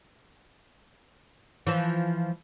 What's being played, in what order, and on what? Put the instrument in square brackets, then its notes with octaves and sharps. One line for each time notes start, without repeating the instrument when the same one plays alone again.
[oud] E3 F3